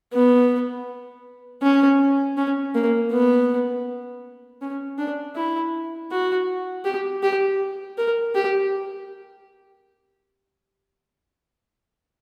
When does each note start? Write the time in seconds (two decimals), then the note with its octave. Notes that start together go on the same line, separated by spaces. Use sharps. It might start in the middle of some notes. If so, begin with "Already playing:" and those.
0.13 B3
1.63 C#4
2.37 C#4
2.75 A#3
3.12 B3
4.61 C#4
4.98 D4
5.36 E4
6.11 F#4
6.85 G4
7.23 G4
7.98 A#4
8.35 G4